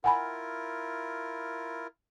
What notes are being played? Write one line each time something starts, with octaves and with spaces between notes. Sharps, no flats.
E4 F4 A#4 F#5 G#5 B5